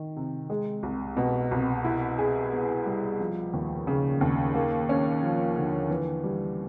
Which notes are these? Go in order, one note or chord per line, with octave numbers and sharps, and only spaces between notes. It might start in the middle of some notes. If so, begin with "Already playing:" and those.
Already playing: D#3
C3
G#3
C2
B2
C2
E4
G#4
B3
G3
F3
D#2
C#3
D#2
A#3
C#4
F3
D3
E3
G3